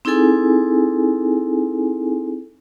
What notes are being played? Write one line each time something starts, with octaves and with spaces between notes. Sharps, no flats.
C4 D#4 E4 G#4 A4 G#5